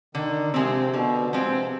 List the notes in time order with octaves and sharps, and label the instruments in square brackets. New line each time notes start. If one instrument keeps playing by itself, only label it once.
[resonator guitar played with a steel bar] D3 [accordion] D#3
[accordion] C3 [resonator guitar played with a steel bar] F3 G#3 C4
[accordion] B2 [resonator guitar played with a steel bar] D3
[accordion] C3 [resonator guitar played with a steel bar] F3 G#3 C4